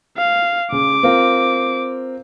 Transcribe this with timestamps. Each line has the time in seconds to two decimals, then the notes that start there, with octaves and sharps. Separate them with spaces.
0.18 F5
0.72 C#3 D6
1.03 C4 F4 A#4